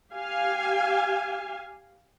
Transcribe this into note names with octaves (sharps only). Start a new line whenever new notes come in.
G4 F5 G#5